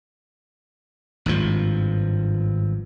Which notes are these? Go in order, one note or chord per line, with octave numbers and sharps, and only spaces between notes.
G#1 G2 F3